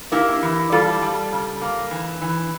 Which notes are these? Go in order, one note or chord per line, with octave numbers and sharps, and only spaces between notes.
A#3 E4 G4
E3
G3 F4 A4
G3
C#3
A#3
E3
E3